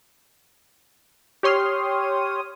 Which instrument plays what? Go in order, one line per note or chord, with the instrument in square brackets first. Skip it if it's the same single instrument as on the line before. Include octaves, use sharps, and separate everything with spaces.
[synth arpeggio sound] G4 C#5 C6 D#6 F6